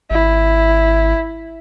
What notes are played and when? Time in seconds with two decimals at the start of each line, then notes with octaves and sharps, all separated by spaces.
0.11 G#1 E4